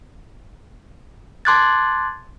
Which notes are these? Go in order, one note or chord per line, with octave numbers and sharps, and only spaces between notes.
A5 C6 D6 F#6 G#6 A6